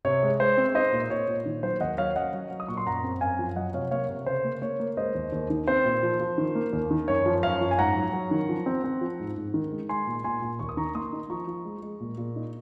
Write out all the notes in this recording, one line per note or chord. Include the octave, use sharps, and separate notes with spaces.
C3 C#5
G#3
G#3 C5
C4
D#4 C5 D#5
A#2
A#2 C#5
A#2
D#3
F#3 C5
D#2 D#5 F#5
F#3 C#5 F5
C#4 D#5 F#5
F#3
F#3
D#6
A#2 C#6
C6
F#2 F#5 A#5
C4
F#2 F5 G#5
F3
F#3 D#5 F#5
C3 C#5 F5
A#3 C#5 F5
C3
C#3 C5
A#3
A#3 C#5
A#3
G#3 C5 D#5
D#2
D#2
D#3
C4 C5
A#2
F3
F3
D#3
A#3
D#2
D#3
F#2 C#5
F3
F#2 C#5 F5
F3
G#5
G#2 F#5 A#5
F#3
F#3
D#3
F3
C4
C4
F3
G#2
G#2
D#3
G#3
G#3 G#5 C6
A#2
A#2 G#5 C6
A#2
D#2 C#6
D#6
D#3 A#5 C#6
A#3 C6 D#6
D#4
F3 A#5 C#6
F3
G#3
G#3
A#2
A#2
D#4